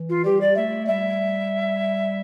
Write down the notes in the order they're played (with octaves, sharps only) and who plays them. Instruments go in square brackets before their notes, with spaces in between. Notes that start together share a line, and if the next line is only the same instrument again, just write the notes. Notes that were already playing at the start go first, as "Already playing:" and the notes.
Already playing: [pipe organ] E3
[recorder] F4
[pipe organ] G3 [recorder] G4
[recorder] D5
[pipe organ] A3 [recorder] E5
[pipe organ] G3 [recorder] E5